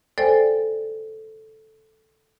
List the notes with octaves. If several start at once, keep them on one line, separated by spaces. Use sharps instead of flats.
A4 C5 D5 G5 G#5